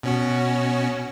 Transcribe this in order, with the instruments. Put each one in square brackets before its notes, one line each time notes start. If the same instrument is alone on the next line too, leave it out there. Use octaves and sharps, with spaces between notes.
[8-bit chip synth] B2 C#4 F#4